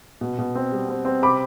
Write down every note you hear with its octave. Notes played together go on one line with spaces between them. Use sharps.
B2
B2
C4
G3
C4
C4
C3 B5 D6